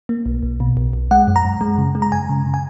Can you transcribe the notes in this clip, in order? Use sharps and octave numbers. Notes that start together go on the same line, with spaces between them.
A#3
B1
B1
B2
B1
B1
G#3 F#5
F#2
A#5
F#2
G#3
C#3
G#3
A#5
F#2 G#5
C#3
C#3
G#5